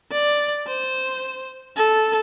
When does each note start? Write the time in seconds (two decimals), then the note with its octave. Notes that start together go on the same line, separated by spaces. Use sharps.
0.12 D5
0.67 C5
1.77 A4